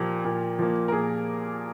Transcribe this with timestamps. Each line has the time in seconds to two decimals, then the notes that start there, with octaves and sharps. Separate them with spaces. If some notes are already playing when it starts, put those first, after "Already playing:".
Already playing: A#2 F3 A#3 G4
0.25 A#2
0.59 F3 A#3
0.88 A#4
0.92 A#2 G#4